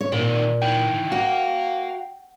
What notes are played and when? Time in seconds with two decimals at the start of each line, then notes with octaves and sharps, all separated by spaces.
0.01 C#5
0.12 A#2 D#3 C4
0.62 D#3 E3 G5
1.12 F#4 F5 A#5